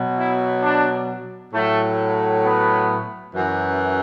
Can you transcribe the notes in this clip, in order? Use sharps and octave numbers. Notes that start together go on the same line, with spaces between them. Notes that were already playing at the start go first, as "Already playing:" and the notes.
Already playing: B2 F#3
E4
D4
A2 F#3 A3
B3
F#2 E3